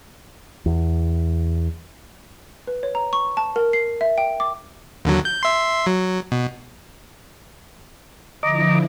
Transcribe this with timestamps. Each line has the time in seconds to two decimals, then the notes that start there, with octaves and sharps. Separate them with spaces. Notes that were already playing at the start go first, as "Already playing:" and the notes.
0.66 E2
2.67 B4
2.83 C#5
2.95 A#5
3.13 C#6
3.37 A5
3.56 A#4
3.73 C7
4.01 E5
4.18 G5
4.40 D6
5.05 D#2 D3 F#3
5.25 G6
5.43 E5 C6
5.86 F#3
6.32 B2
8.43 D3 F3 E4 D#5 A#5 D6